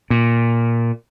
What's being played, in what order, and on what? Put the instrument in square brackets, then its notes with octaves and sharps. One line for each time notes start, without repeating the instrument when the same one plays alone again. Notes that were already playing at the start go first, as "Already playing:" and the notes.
[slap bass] A#2